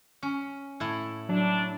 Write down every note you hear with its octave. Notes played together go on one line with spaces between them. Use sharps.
C#4
A2 E4
F#3 D4